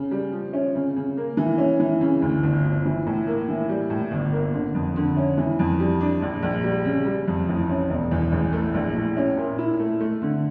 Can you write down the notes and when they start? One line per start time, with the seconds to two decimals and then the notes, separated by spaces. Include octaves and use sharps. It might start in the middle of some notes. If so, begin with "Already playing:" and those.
Already playing: C#3
0.11 G3
0.32 F3
0.53 C#4
0.75 C#3
0.96 C#3
1.17 A#3
1.37 E3
1.58 C#4
1.80 E3
2.01 C#3
2.22 D2
2.43 G1
2.64 F3
2.85 E3
3.06 A2
3.27 A#3
3.49 E3
3.69 G3
3.90 A2
4.11 G1
4.32 A#3
4.53 D3
4.75 F2
4.96 D3
5.17 C#4
5.38 E3
5.59 F2
5.80 G3
6.01 D4
6.22 A#1
6.43 A#1
6.64 G3
6.85 C#3
7.06 G3
7.28 F2
7.48 A1
7.69 C#4
7.90 E1
8.11 E2
8.32 A1
8.53 A3
8.74 A#1
8.95 A2
9.17 C#4
9.37 A#2
9.58 E4
9.80 A3
10.01 A3
10.22 D3